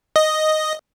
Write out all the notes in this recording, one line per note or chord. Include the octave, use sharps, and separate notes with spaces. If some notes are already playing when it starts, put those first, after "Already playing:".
D#5